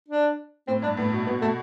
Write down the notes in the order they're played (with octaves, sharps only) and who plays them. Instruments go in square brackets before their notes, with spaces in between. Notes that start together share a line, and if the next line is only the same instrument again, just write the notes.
[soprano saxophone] D4
[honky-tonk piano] A2 [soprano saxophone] C4
[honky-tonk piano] G2 [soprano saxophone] D4
[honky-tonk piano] A2 [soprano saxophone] B3
[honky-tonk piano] B2
[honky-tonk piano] B2 [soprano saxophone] B3
[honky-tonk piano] B2 [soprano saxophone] A3